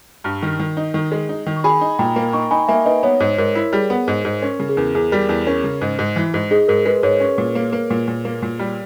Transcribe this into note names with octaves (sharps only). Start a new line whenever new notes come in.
G2 A#5 C#6
D#3
D#3
D#4
D#3
G#3
D#4
D#3
C#6
G#4 G#5 B5
D#4
A#2 G5 A#5
A#3
D#4 A#5 C#6
D#4 G#5 B5
A#3 E5 G#5
D#4 B4 D#5
B3 C#5
G#2
G#2 A#4
E4
G3 G#4
B3
G#2
G#2
C#4 A#4
C#3 A#4
G#4
E2 A#4
E2 G#4
G3 A#4
E2
C#4 A#4
C#3
G#2
G#2
E3
G#2
D#4 G#4
G#2 A#4
G#3 B4
G#2 C#5
C#4
A#2
A#3
A#3
A#2
A#2
A#3
A#2
G3